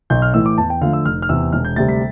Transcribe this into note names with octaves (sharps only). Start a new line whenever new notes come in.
B1 G6
F6
A2 E3 E6
D6
E2 A5
G5
D3 F3 A3 F5
E6
F1 F6
F6
E2 C3 E6
E1 F6
G6
D2 C3 G3 A6
B6